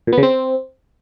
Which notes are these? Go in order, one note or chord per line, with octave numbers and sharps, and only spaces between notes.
A#2
B3
C#3
C4